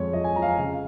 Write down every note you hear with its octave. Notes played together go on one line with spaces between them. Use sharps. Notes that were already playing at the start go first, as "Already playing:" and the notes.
Already playing: F2 G#3 C#5
F3 D#5
G#5
F3 A#5
F5
G#5
C#3 F5